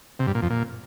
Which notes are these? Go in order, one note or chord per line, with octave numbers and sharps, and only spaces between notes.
C3
G2
A#2
F2
A#2